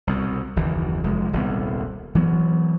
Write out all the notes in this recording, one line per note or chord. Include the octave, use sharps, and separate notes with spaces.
C2 B2
F#1 D#2 E3
F1 G#3
D#1 C2 B3
E3 F#3 A#3 B3